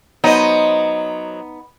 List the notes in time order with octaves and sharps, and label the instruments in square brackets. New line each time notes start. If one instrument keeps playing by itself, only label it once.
[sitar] F#3 C5 D#5 [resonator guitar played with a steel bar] B3 D#4